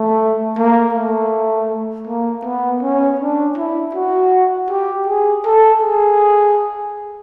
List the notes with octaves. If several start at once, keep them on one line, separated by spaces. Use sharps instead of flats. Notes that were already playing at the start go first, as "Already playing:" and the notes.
Already playing: A3
A#3
A3
A#3
B3
C#4
D4
E4
F#4
G4
G#4
A4
G#4